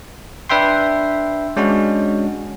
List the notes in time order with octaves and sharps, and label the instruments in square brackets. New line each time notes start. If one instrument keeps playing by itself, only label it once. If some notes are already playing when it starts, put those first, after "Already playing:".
[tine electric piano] D4 B4 E5 G5 C6
G#3 C#4 D4 F#4